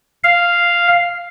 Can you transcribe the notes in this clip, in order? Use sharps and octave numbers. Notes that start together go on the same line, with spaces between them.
F5